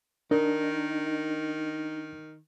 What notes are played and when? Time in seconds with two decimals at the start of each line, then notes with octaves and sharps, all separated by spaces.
0.31 D#3 D4 D#4 A#4